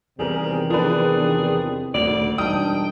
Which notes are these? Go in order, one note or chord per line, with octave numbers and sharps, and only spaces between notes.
E2 C3 D#3 G3 C4 G#4 A#4
F3 D4 G#4 B4
D#1 D2 D5 F7
E1 G3 D4 D#4 G5 A5 D#6